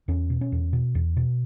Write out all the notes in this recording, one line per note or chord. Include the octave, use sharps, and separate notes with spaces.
E2 C#4
B2
C#4
E2
B2
E2
B2